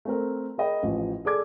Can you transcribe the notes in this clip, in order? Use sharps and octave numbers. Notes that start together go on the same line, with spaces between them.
A3 C4 A#4
G#4 A#4 D#5 G5 B5
A1 F3
G#4 A4 D5 D6 G#6